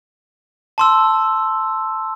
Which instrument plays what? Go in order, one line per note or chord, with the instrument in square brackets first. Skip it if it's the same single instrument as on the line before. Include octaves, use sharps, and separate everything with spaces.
[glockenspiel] A5 C6 E6